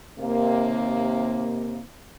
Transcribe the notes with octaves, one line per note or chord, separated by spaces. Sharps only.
D#2 C3 A#3